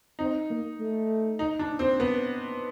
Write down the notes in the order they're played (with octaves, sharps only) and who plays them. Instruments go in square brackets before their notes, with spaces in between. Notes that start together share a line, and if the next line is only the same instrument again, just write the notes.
[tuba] C4 [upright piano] D#4
[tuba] A#3
A3
[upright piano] D#4
D4
C4
B3